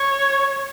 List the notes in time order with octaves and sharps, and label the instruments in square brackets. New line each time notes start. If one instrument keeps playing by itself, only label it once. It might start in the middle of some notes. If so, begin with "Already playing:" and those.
Already playing: [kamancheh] C#5